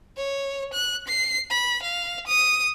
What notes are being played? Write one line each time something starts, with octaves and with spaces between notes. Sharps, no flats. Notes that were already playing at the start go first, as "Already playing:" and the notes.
C#5
F#6
C7
B5
F5
D#6